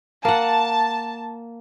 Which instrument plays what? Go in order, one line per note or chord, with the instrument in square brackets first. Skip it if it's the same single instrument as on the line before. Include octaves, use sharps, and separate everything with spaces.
[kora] A#3 F#5 [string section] A5